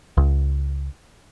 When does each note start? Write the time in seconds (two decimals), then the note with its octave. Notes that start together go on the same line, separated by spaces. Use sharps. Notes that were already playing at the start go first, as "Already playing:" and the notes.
0.17 C#2